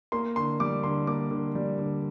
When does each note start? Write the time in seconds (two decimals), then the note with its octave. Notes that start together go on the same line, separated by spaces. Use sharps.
0.12 A#3 C6
0.36 D3 C6
0.60 G3 D6
0.84 D3 C6
1.07 A#3 D6
1.31 D3
1.55 G3
1.79 D3